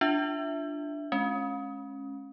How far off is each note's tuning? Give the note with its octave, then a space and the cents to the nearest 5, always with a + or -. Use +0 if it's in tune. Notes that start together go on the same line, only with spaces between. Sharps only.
D4 +0 F4 -5 E5 +0
G#3 +30 C#4 -15